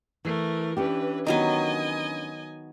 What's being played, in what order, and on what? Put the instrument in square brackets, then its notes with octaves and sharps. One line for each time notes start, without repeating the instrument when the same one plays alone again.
[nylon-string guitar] E3 [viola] A3 A#4
[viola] E3 B4 [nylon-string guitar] C#4 D4 G4
[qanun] D#3 F#3 B3 [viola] D#5 G#5